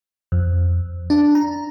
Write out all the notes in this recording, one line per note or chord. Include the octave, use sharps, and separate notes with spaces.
F2
D4
A#5